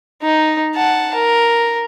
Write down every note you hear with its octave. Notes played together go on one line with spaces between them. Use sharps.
D#4
F#5 A5
A#4